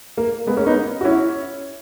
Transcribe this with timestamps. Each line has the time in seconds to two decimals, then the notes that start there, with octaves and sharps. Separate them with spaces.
0.18 A#3
0.47 G#3 B3
0.57 A#3 C#4
0.66 B3 D#4
1.01 F#4
1.05 C#4 E4